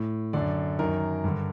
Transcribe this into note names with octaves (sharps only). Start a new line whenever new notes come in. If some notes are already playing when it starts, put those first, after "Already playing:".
Already playing: A2
F#2 D3 D5
F#2 D#3 A#4
G2 D3